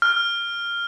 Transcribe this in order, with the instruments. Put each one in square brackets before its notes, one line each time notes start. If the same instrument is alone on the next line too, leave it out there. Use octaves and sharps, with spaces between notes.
[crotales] F6